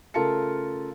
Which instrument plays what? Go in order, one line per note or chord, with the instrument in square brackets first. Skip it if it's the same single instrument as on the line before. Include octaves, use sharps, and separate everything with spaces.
[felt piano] C#3 A3 F4 A#4 A5 C#7